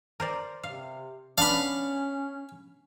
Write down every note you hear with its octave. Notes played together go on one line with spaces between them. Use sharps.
A#4 C5 D5
C3 F5
B3 C#4 D4 F5 B5